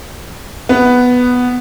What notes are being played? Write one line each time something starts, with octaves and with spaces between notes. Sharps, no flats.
B3